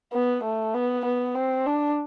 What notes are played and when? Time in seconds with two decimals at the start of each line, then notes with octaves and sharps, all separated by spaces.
0.13 B3
0.43 A3
0.74 B3
1.05 B3
1.34 C4
1.66 D4